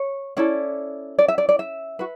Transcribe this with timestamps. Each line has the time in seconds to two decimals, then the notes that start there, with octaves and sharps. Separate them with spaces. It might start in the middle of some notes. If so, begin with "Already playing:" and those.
Already playing: C#5
0.37 C#4 E4 A4 D5
1.19 D5
1.28 E5
1.38 D5
1.49 D5
1.59 E5
1.99 F#4 B4